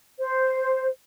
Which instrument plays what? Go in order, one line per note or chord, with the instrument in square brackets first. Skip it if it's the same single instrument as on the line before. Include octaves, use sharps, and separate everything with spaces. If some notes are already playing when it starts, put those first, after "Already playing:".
[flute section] C5